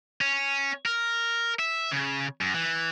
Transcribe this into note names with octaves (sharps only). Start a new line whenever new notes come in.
C#4
A#4
E5
C#3
F#2
E3